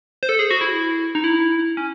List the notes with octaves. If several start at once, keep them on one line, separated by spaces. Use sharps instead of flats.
C5
A4
G#4
F#4
E4
D#4
E4
C#4